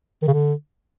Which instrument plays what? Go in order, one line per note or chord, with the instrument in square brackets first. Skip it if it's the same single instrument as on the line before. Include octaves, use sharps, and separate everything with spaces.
[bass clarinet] D#3
C#3
D3